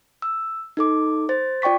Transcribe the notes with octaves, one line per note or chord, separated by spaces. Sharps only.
E6
D#4 A4 D6
C5 A6
F4 D5 G5 C#6 B6